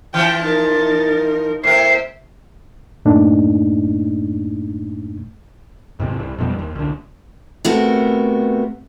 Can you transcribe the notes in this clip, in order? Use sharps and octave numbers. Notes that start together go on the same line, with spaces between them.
E3 F3 G5
D#4 A#4 A6
A2 A#4 C5 E5 C7
F#2 A2 A3 A#3 D4 D#4
D#2 G#2 C3 C4
C2
F2 B2 G3
D#2
C2 D3
C3 A3 B3 F#4 A#4